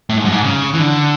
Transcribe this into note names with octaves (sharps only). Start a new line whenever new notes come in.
A2
G#2
F#2
G#2
C#3
E3
D3